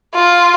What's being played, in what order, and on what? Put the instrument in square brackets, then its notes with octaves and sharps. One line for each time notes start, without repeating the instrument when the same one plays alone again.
[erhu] F4